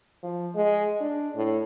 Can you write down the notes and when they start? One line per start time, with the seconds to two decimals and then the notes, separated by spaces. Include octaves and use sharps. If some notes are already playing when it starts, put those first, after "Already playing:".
0.23 F3
0.55 G#3
1.01 D4
1.35 A2